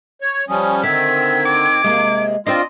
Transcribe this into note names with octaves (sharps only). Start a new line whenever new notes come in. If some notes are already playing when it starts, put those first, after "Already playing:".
C#5
F3 G3 C#4 D#6
D3 D#3 C4 E5 G#6
D6
C3 G#3 A#3
C4 D4 F4 D5 D#5